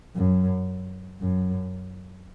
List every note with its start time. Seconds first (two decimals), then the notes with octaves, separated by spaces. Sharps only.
0.15 F#2
1.20 F#2